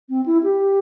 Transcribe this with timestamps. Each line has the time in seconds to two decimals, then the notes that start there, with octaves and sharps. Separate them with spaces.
0.09 C4
0.26 E4
0.43 G4